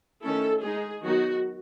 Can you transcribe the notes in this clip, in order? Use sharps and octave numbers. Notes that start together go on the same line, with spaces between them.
D#3 A3 C#4 E4 A4
G#3 D#4 G#4
D#3 F#3 B3 D#4 F#4